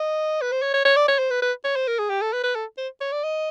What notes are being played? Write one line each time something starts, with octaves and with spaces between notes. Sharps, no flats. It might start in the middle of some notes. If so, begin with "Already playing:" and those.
Already playing: D#5
B4
C5
C#5
C#5
C#5
D5
C#5
C5
B4
B4
C#5
C5
A#4
G#4
G4
A4
B4
B4
A4
C5
C#5
D5
D#5